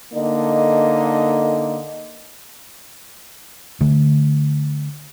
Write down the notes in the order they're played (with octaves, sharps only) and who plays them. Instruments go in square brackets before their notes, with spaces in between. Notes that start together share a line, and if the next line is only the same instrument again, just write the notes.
[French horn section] D3 A#3 D#4 A4 D#5
[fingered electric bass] D3 A3